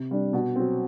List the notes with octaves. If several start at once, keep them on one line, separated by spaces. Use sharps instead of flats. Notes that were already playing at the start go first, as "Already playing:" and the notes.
Already playing: C3
G3 D4
B2
F#3 C4